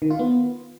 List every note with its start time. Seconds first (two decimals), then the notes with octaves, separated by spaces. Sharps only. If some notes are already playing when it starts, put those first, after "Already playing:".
0.02 D#3
0.11 F4
0.19 B3